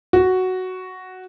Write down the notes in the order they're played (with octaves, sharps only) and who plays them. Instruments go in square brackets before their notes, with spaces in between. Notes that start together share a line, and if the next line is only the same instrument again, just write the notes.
[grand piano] F#4